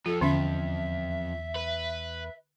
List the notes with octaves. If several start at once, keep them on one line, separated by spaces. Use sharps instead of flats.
F2 F4 A4
E2 D3 C#4 E5
B4